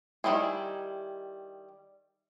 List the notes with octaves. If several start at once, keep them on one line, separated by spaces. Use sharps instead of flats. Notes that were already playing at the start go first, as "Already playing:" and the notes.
D#3 F3 G3 E4 G#4